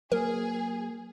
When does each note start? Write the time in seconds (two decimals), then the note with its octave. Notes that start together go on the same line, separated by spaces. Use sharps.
0.12 F#3 A#3 G#4 A#4